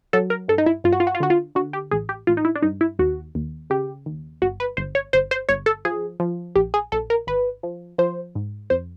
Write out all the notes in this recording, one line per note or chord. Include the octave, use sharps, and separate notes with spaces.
F#3 A4
A#4
G2 A4
D#4
E4
G2 F4
F#4
F4
F#4
F4
D3 F#4
F4
D3 F#4
G4
A1 G#4
G4
A1 F4
D#4
E4
D4
G2 D#4
E4
D#2 F#4
D#2
C#3 G4
D#2
G1 F#4
B4
G1 C5
C#5
G1 C5
C5
G1 C#5
A4
F3 G#4
F3
A#1 G4
G#4
A#1 A4
A#4
G#1 B4
F3
F3 C5
G#2
F2 C5